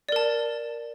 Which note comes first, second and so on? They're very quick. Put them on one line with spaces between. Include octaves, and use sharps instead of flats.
D5 A#4 A5